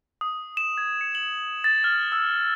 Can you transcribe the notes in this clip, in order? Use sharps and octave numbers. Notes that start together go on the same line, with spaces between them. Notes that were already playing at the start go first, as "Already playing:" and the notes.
D#6
E7
G#6
C#7
F#7
A6
F6
E6